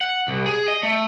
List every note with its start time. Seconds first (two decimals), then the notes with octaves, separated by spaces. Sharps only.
0.01 F#5
0.28 C2
0.46 G#4
0.68 D#5
0.83 A3